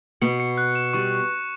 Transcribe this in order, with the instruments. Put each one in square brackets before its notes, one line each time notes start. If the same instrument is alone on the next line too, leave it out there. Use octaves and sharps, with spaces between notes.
[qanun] B2 B3 [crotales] C#7
[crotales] C#7
F#6
E7
[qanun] G3 [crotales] C#6